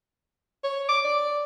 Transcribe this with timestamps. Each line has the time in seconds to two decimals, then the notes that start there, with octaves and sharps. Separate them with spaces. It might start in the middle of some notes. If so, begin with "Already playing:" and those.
0.64 C#5
0.89 D6
1.04 D5